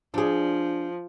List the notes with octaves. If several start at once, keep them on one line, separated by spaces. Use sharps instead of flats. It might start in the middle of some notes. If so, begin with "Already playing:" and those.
F3 D4 G#4